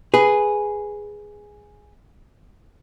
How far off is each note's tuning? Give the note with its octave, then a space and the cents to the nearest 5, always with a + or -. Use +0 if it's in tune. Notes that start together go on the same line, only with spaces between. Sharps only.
G#4 +0 B4 +0